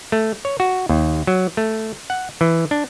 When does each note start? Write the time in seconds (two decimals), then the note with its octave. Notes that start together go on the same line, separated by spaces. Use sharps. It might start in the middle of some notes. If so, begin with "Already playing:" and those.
0.12 A3
0.45 C#5
0.60 F#4
0.89 D#2
1.27 F#3
1.57 A3
2.10 F#5
2.41 E3
2.71 D4